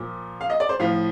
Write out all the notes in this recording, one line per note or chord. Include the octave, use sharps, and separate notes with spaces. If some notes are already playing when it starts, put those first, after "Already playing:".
Already playing: A#2 F3
F5
D#5
D5
C5
A2 F3 F5